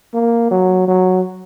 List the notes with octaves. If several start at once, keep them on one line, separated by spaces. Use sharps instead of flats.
A#3
F#3
F#3